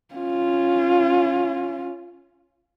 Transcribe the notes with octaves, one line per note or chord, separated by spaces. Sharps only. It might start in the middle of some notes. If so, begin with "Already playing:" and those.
C#4 F4